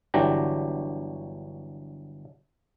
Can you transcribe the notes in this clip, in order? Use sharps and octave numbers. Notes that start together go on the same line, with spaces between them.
G1 E3 F#3 D4 G4 A#5